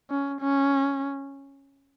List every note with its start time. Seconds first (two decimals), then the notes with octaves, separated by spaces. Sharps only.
0.10 C#4
0.41 C#4